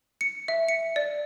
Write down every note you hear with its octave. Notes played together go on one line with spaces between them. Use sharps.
C#7
E5
C#7
D5